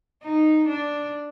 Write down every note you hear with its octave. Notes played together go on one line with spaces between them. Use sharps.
D#4
D4